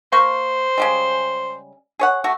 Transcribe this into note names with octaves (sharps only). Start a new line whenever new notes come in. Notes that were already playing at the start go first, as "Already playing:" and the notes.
A#3 C5 C#6
C#3 G3 G#3
G#4 C#5 F#5
A3 F#4